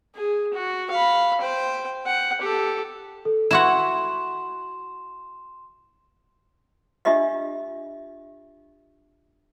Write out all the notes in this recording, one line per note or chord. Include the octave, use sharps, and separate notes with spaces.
G#4
F#4
F5 B5
C5 G5
F#5 G5
G4 A4
A4
E4 F#4 F#5 C6 E7
D4 F4 G4 D#5 E5